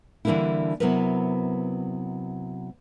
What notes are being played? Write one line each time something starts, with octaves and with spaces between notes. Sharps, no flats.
D3 E3 G3 A#3 D4 E4
C3 F#3 B3 E4 A#4 B4